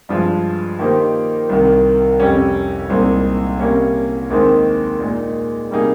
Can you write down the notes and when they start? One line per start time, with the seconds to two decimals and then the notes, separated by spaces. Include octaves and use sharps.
0.09 G2 F3 G#3
0.79 D#3 A#3 D#4 G4 C5
1.49 C2 C3 D#3
2.19 F2 C3 G3 C#4 G4
2.89 C2 A#2 G#3 C4 D#4
3.60 C3 G3 A#3 C#4
4.30 D#2 D#3 G#3 C4 D#4
5.00 A#2 G#3 D#4
5.70 C3 G3 A#3 D#4 G#4